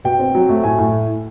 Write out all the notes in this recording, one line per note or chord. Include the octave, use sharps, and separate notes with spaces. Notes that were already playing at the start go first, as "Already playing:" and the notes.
B2 G5
C4
F#3
A3
A2 G#5
A2